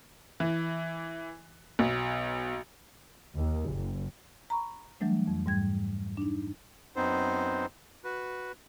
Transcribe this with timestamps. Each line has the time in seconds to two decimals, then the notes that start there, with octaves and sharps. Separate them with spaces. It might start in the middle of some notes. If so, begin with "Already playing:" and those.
0.40 E3
1.79 B1
3.38 D#2
3.71 F#1
4.50 A#5 B5 C#6
5.00 E3 F#3 G3 A3 D4
5.27 F2
5.46 G#2 G3 G#6
6.17 D4 D#4
6.96 F#2 B3 C4 D#4 C5
8.04 F#4 B4